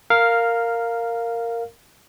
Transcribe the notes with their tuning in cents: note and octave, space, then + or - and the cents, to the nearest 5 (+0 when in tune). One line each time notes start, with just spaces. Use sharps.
A#4 -10 F5 +0